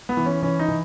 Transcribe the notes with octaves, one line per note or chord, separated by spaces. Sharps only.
B3
E3
C#4
E3 C#4
D#4
E3